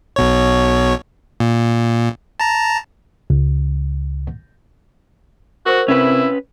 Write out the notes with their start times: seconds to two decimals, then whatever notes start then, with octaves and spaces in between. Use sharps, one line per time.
0.16 B1 B2 C#5
1.40 A#2
2.40 A5 A#5
3.30 C#2
5.66 F#4 A#4 C5 C#6
5.88 C3 C#4 E4 B4